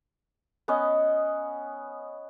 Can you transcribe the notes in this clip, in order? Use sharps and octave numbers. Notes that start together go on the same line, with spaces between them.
B3 C#4 D#5